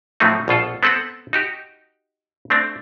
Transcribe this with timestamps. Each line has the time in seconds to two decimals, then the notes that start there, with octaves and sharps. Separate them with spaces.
0.20 A2 F3 F#3 A3 C4 D#4
0.48 A#1 B2 F4 A4
0.83 B3 C4 A4 B4 F#5
1.33 D#4 F#4 G4
2.50 A3 C4 D4